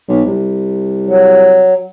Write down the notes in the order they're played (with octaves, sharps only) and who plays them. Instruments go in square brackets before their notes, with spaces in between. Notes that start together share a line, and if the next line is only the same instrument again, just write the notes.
[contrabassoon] B1
C2
[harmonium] F#3